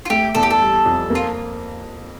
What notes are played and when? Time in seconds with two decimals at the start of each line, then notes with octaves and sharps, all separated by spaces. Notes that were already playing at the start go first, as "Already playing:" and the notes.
0.05 F4
0.10 A3 G4
0.35 E2 A4
0.43 G4
0.51 A4
0.60 G3
0.86 F2
1.10 A#3
1.15 F4